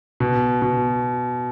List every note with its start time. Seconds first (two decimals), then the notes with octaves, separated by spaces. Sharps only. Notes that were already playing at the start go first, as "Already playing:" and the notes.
0.20 B2
0.62 B2